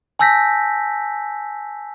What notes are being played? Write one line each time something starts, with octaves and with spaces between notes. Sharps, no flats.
G#5 A5 E6 G6 A#6 B6